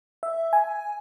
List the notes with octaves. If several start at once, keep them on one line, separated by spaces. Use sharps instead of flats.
E5
G#5